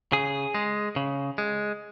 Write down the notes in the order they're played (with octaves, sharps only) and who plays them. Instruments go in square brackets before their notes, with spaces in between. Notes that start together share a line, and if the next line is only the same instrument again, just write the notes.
[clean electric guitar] C#3 G#4
G#3
C#3
G#3